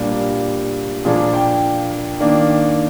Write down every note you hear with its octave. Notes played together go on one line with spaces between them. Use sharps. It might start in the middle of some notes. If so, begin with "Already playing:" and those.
Already playing: A#2 G3 A#3 D4 G4
A#2 F3 A#3 D4 G#4
G5
D#3 A#3 D4